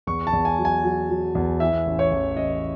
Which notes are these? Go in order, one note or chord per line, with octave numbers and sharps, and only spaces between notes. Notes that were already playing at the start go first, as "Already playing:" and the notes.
E2 C#6
A5
E2
G#5
F#3
G#5
F#3
F#3
E2
E3 E5
A1
C#5
A1
A1 D#5